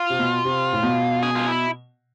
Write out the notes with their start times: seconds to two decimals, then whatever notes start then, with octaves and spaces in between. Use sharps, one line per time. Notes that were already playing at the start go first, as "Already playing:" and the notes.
Already playing: F4
0.10 C3
0.19 B2
0.45 C3
0.73 A2
0.83 B2
1.23 G#4
1.35 F4
1.48 E4